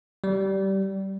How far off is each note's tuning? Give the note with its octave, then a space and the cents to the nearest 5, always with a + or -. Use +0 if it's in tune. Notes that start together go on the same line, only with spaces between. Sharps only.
G3 -20